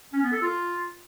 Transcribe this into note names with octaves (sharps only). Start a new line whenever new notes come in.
C#4
B3
A4
F4